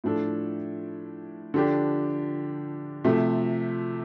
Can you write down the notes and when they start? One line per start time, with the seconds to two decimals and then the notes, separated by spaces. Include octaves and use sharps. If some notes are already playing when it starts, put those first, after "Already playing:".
0.04 A2 F3 D4 A4
1.54 D3 F3 D4 G4
3.04 C3 F3 A3